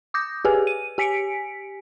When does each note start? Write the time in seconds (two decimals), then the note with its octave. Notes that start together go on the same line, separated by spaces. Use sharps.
0.14 D6 D#6 G6 A#6
0.45 G4 G#4 B4 G#5
0.67 D#7
0.98 G4 G#5 B6 C#7 D7